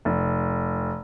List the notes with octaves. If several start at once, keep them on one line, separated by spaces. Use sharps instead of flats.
F1